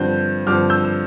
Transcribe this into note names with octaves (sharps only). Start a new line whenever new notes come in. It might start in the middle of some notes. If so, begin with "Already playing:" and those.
Already playing: G2 D3 F3 C4 G6
G2 D3 F3 C4 D6 F6
E6 G6
E6